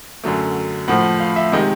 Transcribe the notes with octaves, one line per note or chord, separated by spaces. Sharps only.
F#2 D3 F#3 A3
A2 F3 A3 F#5
F5
E5
C3 D#3 G#3 D#5